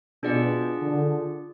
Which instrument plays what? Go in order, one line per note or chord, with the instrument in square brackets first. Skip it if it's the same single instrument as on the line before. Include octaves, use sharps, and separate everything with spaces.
[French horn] B2 [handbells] D4 F4 G#4 D5 F#5
[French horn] D3